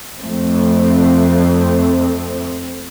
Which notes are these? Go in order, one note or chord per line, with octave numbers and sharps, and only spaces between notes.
F2 A3 C4